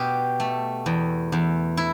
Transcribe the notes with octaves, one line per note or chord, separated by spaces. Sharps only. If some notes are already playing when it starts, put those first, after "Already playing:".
Already playing: B2 G4
A3
E2
E2
E4